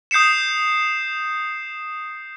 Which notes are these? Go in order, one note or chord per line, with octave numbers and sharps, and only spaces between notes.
D#6 G6 C7 C#7 E7